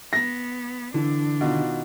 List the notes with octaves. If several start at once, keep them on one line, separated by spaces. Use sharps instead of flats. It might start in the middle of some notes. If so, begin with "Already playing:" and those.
B3 A#6
D3 E3 D4
B2 D#3 F4